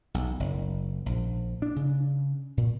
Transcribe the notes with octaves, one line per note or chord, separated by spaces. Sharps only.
B1
F#1
A#1
D4
C#3
A#2